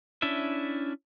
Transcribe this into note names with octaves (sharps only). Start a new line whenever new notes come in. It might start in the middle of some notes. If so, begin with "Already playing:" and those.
C#4 D4 E4 E5